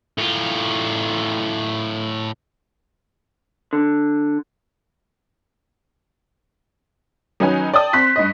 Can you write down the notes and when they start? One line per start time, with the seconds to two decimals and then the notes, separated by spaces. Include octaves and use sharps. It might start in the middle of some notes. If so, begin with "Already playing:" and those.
0.18 A2 F4
3.73 D3
7.40 D#3 F#3 C#4 D#4 B4 G#5
7.74 D5 G5 A5 D#6
7.93 C4 C6 F#6 B6
8.16 G2 D#5